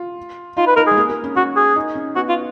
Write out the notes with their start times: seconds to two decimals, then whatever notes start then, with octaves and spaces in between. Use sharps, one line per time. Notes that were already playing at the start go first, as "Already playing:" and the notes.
Already playing: F4
0.57 D#4 F4
0.67 B4
0.77 D#4 A#4
0.87 G#3 G#4
0.97 A#3
1.09 A#3
1.24 C#4
1.36 C#4 F#4
1.56 G#4
1.76 D#4
1.95 C#4
2.16 B3 F#4
2.29 F4